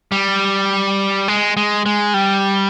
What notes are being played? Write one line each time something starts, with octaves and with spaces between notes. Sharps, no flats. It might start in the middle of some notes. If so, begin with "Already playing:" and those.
G3
G#3
G#3
G#3
G3